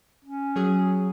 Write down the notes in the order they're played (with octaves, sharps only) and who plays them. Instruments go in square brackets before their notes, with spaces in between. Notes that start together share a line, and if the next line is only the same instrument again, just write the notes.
[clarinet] C#4
[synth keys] F#3 G#4